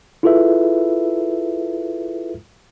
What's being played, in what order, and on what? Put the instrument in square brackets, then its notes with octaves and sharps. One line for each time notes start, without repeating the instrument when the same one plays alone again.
[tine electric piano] E4 F4 G#4 A4 B4 E5